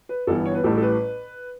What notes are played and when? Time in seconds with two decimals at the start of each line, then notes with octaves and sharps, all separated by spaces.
0.09 B4
0.27 G1 G2 E3 B3 A4
0.46 C#5
0.55 B4
0.64 A1 A2 G3 A4
0.78 A4
0.82 B4